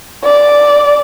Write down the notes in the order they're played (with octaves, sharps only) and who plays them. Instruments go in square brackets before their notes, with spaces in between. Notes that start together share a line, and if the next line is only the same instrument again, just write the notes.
[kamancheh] D5